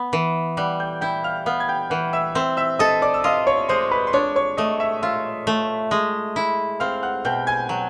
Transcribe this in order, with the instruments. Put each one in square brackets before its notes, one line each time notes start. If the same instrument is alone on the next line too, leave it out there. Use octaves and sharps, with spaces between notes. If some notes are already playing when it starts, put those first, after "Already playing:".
Already playing: [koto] B3
E3
[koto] G3 [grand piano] F#5 F#6
[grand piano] G5 G6
[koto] E4 [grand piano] G5 G6
[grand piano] F5 F6
[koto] B3 [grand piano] F5 F6
[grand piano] G#6
G5 G6
[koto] E3 [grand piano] F#5 F#6
[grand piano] E5 E6
[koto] C4 [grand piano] E5 E6
[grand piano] E5 E6
[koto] A4 [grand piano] D#5 D#6
[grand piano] D5 D6
E6
[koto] F4 [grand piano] D#5 D#6
[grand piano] C#5 C#6
[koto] G#3 [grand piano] C5 C6
[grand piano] B4 B5
C6
[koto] D4 [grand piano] C#5 C#6
[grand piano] C#5 C#6
[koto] A3 [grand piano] D#5 D#6
[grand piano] E5 E6
[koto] F4 [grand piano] E5 E6
[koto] A3
G#3
E4
[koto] C4 [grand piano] F5 F6
[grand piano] F#5 F#6
[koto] B2 [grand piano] G5 G6
[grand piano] G#5 G#6
[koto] F#3